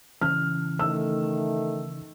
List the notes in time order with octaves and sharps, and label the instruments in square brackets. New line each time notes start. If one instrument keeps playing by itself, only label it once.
[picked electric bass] C#3 E3 C#4 [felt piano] F6
[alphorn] D#3 [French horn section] A3 [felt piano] E6